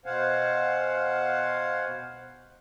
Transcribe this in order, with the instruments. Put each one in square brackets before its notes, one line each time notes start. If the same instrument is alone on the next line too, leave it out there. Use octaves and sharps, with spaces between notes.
[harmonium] B2 C5 F5 F#5 G#5